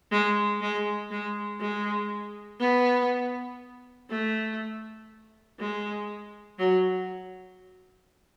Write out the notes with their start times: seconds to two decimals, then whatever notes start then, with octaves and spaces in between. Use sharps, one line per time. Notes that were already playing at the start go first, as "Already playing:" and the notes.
0.12 G#3
0.61 G#3
1.11 G#3
1.60 G#3
2.60 B3
4.10 A3
5.59 G#3
6.59 F#3